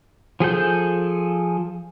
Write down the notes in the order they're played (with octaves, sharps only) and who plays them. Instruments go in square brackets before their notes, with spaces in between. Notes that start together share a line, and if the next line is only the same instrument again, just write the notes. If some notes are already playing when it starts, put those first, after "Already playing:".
[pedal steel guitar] F3 G#4 A4 G6